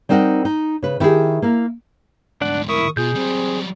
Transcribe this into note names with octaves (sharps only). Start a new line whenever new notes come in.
G3 C4 D#4 A#4 D#5 F#5
D#4
C#3 B4
D#3 E4 G4 G#4
A#3 E4 A#4
D2 G#2 D4 D5 F#5
E4 A#4 C#6 D#6
B2 F4 G#4 G6
F#3 G3 C4